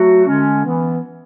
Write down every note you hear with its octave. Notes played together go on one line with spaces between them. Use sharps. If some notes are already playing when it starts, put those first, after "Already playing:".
Already playing: F#3 A3 F#4
D3 G#3 C#4
E3 B3